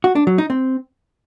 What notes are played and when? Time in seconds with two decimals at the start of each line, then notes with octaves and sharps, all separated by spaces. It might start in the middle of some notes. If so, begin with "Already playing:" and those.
0.04 F#4
0.15 D4
0.27 F#3
0.38 D#4
0.50 C4